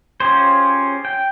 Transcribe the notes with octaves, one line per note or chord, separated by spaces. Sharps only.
C#4 F4 G4 G#4 C5
G5